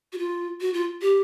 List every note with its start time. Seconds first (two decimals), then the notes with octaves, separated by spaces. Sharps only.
0.13 F#4
0.18 F4
0.61 F#4
0.74 F4
1.02 G4